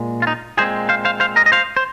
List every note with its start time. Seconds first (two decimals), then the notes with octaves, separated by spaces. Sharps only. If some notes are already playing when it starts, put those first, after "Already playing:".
Already playing: A#2 G#3
0.22 F4
0.27 D#4
0.57 A#2 G#3 C4 G#4 C5
0.89 C5 F5
1.05 C5 F5
1.20 C5 F5
1.36 A#4 D#5
1.46 D#5
1.52 C5 F5
1.77 C5